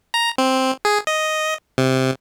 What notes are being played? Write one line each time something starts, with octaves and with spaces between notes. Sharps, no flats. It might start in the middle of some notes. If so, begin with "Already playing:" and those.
A#5
C4
G#4
D#5
C3